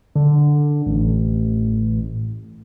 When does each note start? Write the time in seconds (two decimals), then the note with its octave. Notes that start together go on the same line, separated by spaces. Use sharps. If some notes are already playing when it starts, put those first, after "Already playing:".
0.15 D3
0.86 A1